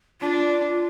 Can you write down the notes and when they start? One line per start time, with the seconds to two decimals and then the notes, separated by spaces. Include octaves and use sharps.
0.21 D4 F4